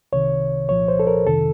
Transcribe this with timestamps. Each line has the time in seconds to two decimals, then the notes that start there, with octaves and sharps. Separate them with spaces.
0.12 C2 C3 D#3 C#5
0.69 C2 A#2 F3 C#5
0.88 C5
1.00 A4
1.07 A#4
1.26 F2 C3 D#3 A4